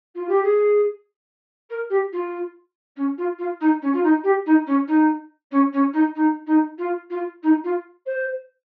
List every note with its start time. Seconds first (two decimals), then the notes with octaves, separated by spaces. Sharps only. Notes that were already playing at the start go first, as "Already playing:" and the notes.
0.15 F4
0.28 G4
0.42 G#4
1.70 A#4
1.90 G4
2.12 F4
2.96 C#4
3.18 F4
3.38 F4
3.60 D#4
3.82 C#4
3.93 F4
4.03 D#4
4.23 G4
4.46 D#4
4.66 C#4
4.87 D#4
5.51 C#4
5.73 C#4
5.93 D#4
6.15 D#4
6.46 D#4
6.78 F4
7.10 F4
7.43 D#4
7.64 F4
8.06 C5